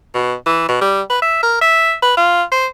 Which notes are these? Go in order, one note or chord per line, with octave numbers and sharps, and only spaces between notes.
B2
E3
B2
G3
B4
E5
A#4
E5
B4
F4
C5